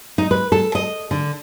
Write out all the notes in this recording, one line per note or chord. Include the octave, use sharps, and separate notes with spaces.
D#4
B4
A4
D#5
D3